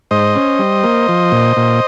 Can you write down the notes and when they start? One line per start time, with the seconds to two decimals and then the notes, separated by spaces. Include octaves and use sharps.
0.11 G#2 C5 D#5
0.36 C#4
0.59 G3
0.83 A#3
1.09 F3
1.32 A#2
1.57 A#2